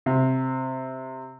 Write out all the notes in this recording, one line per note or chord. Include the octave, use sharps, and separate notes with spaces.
C3